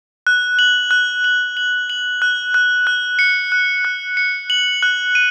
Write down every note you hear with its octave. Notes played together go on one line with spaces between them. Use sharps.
F#6
F#7
F#6
F#7
F#7
F#7
F#6
F#6
F#6
C#7
F#6
F#6
C#7
F#7
F#6
D#7